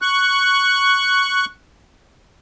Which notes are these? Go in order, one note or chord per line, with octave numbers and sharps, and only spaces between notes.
C#6 F#6